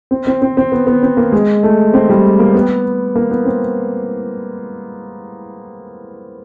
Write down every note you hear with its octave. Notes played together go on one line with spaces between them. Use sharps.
C4
C4
C4
C4
B3
B3
C4
A#3
G#3
A3
C4
G3
A#3
B3
A#3
B3
C4